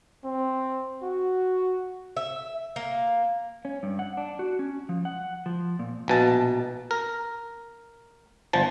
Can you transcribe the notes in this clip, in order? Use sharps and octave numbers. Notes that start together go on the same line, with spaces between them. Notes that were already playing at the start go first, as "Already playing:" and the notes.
C4
F#4
E5
A#3
C#4
G2
F#5
D4
F#4
C#4
F3
F#5
F3
A#2
A#1 B2 A5
A#4
G1 F3 A5